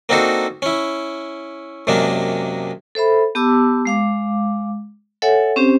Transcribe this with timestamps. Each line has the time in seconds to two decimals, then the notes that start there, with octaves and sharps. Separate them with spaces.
0.09 A#3 C4 D4 D#4 F#4 A4
0.62 C#4 E4
1.87 F#2 C3 G#3 A#3 D4
2.95 A4 C5 E5 B5
3.35 B3 G4 A5 D6 E6
3.85 G#3 F5 D6
5.22 A4 C#5 E5 F#5 G#5
5.56 C4 C#4 G4 C5